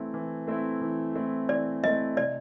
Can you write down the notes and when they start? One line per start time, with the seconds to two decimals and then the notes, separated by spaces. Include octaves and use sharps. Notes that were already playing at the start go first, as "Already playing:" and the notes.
Already playing: E3 A3 C4 E4
0.14 E3
0.47 A3 C4 E4
0.81 E3
1.15 A3 C4 E4
1.49 E3 D5
1.83 A3 C4 E4 D#5
2.17 C3 D5